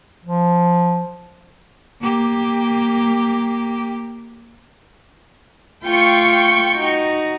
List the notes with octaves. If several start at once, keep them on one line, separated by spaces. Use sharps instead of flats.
F3
A#3 G4
A3 F4 G5 C#6
D#4 F#4